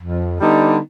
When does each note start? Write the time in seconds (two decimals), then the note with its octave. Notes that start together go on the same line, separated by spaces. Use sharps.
0.02 F2
0.39 D3 G3 B3 D#4